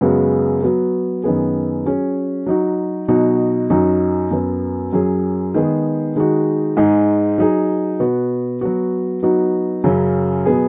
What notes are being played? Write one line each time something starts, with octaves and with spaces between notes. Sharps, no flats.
F#2 C#3 G#3 B3 F#4
F#3 B3 F#4
F#2 D#3 B3 G#4
F#3 C#4 G#4
F#3 D#4 F#4
B2 F#3 D#4 F#4
F#2 F#3 D#4 F#4
F#2 F#3 B3
F#2 F#3 C#4 G#4
D#3 G#3 B3 G#4
D#3 G#3 D#4 F#4
G#2 G#3 D#4 G#4
F#3 D#4 G#4
B2 B3 F#4
F#3 B3 F#4
F#3 B3 D#4 F#4
F#2 C#3 F#3 C#4
B2 F#3 B3 G#4